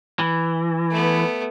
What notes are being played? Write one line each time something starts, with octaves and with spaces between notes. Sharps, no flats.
E3
A3 B3